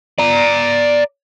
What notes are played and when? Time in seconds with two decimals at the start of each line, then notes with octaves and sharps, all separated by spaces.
0.18 D5 A#5